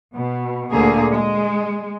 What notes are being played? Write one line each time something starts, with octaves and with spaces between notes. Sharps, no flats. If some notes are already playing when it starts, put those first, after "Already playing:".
B2
D2 A#2 D3 A#3 G#4
G#3